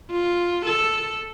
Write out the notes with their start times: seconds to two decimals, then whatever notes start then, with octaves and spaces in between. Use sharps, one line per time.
0.11 F4
0.66 A4